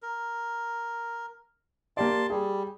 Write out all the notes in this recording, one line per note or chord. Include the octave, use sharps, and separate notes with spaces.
A#4
A#3 G4 D5 A5 C6
G3 G#4